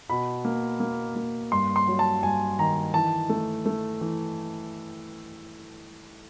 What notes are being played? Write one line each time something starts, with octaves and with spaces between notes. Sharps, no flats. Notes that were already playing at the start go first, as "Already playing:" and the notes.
B2 B5
A#3
A#3
A#3
G2 C6
C6
F#3
A5
G2 G#5
D#3 A#5
E3 A5
A3
A3
E3